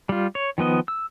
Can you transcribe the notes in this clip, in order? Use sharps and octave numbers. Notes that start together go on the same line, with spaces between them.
G3 F4
C#5
D#3 F3 B3 D#5
E6